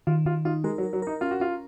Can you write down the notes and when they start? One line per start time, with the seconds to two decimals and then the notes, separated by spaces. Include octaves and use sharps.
0.07 D#3 F4
0.26 D#3 F4
0.45 D#4 F4
0.64 G#3 A#4
0.78 F#3
0.83 A#4
0.93 F#3
1.02 D#4 A#4
1.21 C#4 F4
1.31 F#4
1.40 C#4 F4